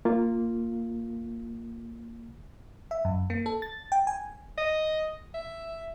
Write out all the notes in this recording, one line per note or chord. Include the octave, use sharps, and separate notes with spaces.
A#3 F4
E5
F#2
A#3
A4
A6
G5
G#5
D#5
E5